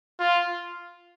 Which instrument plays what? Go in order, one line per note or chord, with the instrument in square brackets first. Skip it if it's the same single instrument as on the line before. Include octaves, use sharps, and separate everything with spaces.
[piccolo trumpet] F4